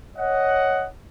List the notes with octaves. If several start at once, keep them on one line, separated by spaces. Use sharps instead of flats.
C#5 D#5 F#5